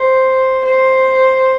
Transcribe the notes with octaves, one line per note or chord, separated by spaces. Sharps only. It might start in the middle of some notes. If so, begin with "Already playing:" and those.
Already playing: C5
C5